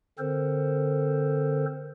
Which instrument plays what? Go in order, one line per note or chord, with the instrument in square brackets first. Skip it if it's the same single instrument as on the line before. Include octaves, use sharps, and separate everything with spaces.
[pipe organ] D3 C4 A4 A#4 C5